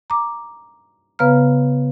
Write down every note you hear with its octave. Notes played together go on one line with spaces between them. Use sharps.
A#5 D6
C#3 B3 B4 F5 A#5 F6